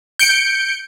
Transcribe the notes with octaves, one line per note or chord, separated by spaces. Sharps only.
G6 C#7 D7